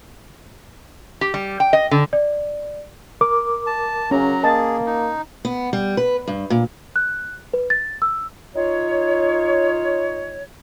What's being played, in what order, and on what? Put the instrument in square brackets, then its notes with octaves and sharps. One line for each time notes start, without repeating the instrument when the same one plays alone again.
[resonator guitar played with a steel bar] G4
G3
G5
D#5
D3
[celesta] D5
[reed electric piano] A#4 D6
[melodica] A5
[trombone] C#3 [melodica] F#3 A#5 [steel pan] C#4
[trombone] A#3 [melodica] G#4 [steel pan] D#5 A5
[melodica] D#4
[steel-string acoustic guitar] B3
G3
B4
G2
A#2
[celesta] F#6
B4
A6
E6
[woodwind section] D#4 F4 C#5